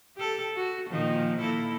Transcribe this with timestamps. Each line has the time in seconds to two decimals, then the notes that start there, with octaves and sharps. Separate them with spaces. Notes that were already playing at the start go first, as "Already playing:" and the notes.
0.16 G4 A4
0.56 F#4
0.90 A#2 D#3 F3
1.40 A#3 E4 A4